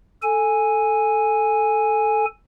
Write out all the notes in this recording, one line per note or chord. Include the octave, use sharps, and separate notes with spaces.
A4 G#5